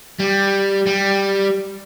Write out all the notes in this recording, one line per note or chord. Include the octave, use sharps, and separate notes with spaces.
G3
G3